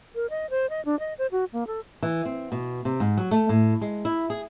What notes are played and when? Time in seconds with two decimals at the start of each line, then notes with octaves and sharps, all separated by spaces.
0.15 A#4
0.30 D#5
0.50 C5
0.70 D#5
0.85 D4
1.00 D#5
1.18 C5
1.32 F#4
1.53 A#3
1.67 A4
2.03 E3
2.25 C4
2.52 B2
2.85 C3
3.00 G#2
3.17 F#3
3.31 A3
3.49 A2
3.81 G#3
4.05 E4
4.30 G#4